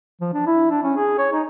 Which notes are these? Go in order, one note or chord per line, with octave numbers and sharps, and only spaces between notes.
F3
D4
E4
D4
C#4
G#4
C#5
D#4